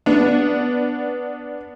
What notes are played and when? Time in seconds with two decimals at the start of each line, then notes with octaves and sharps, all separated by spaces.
0.06 B3 D4